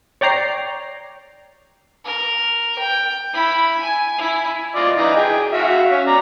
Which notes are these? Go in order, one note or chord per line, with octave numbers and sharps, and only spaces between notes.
C#5 D5 G5 A#5 C7
A#4
G5
E4 B5
G#5
E4
F4 D5 D#5
E3 D#4 D#5
G#4 G5
F#4 E5 F5
C#4
D5 A#5